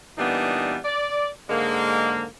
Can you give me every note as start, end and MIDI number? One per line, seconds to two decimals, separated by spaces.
0.18 0.77 46
0.18 0.77 52
0.18 0.77 55
0.18 0.77 59
0.18 0.77 62
0.18 0.77 63
0.85 1.27 74
1.50 2.24 44
1.50 2.24 50
1.50 2.24 56
1.50 2.24 58